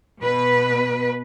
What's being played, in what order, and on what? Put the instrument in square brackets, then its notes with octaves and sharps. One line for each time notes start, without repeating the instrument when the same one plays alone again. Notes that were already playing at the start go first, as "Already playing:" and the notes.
[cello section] B2 B4